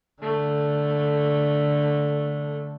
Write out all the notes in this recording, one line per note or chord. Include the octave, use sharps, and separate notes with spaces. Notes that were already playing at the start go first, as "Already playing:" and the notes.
D3 A3